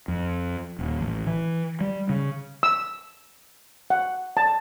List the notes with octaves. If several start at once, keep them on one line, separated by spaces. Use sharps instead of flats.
F2
D#1
A1
E3
G3
C#3
E6
F#5
A5